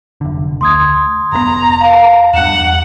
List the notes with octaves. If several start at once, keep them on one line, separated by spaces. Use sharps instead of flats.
F1 D3
D2 C6 D#6 G#6
F1 B2 B3 A#5
F5
E2 G2 F#5 F#6 C#7 E7